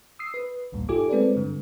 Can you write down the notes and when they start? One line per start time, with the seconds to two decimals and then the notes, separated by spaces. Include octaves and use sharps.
0.19 D#6 E6 C7
0.34 B4
0.72 A1 D2 G2 A#2
0.89 D#4 F4 G4 A4 G#5 D6
1.09 G#3 C4 A4 B4 D5
1.36 G2 D3